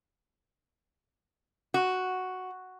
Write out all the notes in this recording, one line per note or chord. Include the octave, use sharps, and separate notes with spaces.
F#4